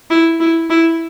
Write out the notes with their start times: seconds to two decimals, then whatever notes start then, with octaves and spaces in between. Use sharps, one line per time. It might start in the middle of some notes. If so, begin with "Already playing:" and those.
0.10 E4
0.40 E4
0.70 E4